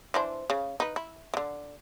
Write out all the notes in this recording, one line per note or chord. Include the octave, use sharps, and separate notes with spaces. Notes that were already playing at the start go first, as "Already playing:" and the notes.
E3 D4 C5
C#3
D#4 B4
E4
D3 E3